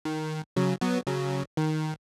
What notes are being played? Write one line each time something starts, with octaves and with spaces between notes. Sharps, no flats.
D#3
C#3 F#3
F#3 B3
C#3 F#3
D#3